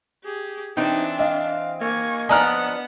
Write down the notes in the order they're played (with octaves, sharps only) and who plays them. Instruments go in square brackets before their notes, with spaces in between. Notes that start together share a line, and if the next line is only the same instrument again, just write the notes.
[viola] G4 G#4
[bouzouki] E3 C4 [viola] D4 [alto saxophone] D#4
[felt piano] D#5 [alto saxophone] F5
[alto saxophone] A#3 [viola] G#5 C#6
[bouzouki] F3 D4 D#5 [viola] B3 F#5 [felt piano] G#5 A#5 F6